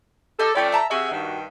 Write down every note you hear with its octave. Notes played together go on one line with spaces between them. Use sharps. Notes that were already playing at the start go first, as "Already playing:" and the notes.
G4 A4 D#5 F6
F3 A3 C#4 D5 G5 B5
E5 A5 A#5
C3 F#4 G#4 E5
G2 D#3